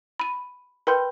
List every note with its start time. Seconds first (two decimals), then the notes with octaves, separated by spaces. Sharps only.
0.20 B5 D#7
0.87 A#4 B4 G5 B5 C6 G6